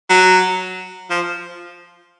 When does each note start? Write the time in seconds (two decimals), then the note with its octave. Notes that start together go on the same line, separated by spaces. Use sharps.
0.10 F#3
1.11 F3